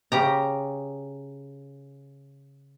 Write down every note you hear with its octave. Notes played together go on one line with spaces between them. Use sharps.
C#3 G4 A#5